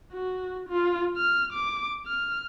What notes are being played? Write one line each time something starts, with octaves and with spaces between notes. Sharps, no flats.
F#4
F4
F6
D6
F6